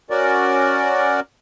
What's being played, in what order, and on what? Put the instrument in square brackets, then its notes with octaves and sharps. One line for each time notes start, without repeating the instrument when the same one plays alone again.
[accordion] C#4 F#4 A#4 D5